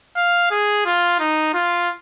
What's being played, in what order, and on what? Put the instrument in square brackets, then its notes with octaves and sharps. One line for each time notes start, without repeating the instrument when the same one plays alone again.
[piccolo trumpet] F5
G#4
F4
D#4
F4